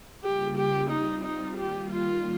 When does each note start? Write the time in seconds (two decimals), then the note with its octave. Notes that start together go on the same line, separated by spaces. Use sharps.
0.24 C#3 G3 A#3 F4 G4
0.57 G4
0.90 G3 C4 D#4 F4
1.23 D#4
1.57 D#3 G3 A#3 F4 G4
1.91 F4